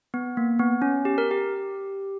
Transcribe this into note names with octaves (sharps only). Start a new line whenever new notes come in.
B3
A#3
B3
C#4
G4
A#4
G4